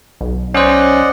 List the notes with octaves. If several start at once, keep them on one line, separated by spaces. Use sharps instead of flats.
B1
C#4 C5 D5 D#5 F#5